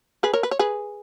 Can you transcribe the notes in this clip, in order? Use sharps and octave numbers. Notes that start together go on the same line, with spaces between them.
G#4 B4
A#4 C#5
B4
C#5
G#4 B4